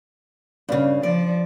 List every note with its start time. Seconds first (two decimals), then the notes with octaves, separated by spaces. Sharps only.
0.69 G2 C#3
1.03 F3 D5